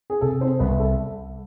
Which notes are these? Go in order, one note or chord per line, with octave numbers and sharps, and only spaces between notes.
G#4
C3 A4
C4 C5
C2 B3 B4
A4